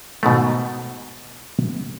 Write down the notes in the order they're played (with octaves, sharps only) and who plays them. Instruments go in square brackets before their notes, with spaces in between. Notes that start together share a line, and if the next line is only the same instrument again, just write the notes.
[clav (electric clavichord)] G#2 B2 D#3 A3